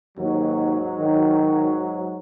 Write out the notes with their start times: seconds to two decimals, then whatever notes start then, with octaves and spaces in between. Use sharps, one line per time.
0.18 D#2 G#2 F#3
0.99 D#3